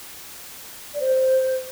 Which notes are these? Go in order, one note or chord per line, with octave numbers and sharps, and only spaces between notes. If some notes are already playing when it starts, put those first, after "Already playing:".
D5
C5